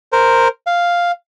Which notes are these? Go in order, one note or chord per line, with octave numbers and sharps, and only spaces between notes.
A#4 C5
F5